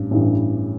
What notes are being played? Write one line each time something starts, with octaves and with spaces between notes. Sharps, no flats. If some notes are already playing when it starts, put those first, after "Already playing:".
Already playing: A1 G2
A1 G2 E3